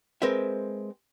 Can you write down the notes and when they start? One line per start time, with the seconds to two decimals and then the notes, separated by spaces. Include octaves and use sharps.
0.22 G#3 C4 A#4 B4 E5